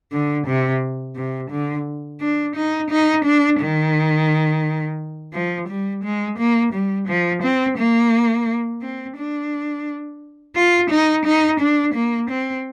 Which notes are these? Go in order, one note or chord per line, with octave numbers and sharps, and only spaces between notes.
D3
C3
C3
D3
D4
D#4
D#4
D4
D#3
F3
G3
G#3
A#3
G3
F3
C4
A#3
C4
D4
F4
D#4
D#4
D4
A#3
C4